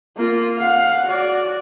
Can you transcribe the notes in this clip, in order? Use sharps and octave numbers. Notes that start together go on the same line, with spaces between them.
A#3 F4
F5 F#5
F#4 D5